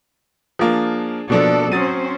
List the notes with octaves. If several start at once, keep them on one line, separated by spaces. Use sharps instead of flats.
F3 A#3 D4 G#4
B2 F3 A#3 D4 A4 D5
F#3 C4 C#4 C5 D#6 A6 D#7